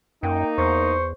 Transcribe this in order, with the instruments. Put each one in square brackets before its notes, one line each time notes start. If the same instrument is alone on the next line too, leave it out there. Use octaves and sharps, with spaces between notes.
[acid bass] F#2 [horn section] A#3 D#4 [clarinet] G5
[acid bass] E2 [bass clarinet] C5 [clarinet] C#6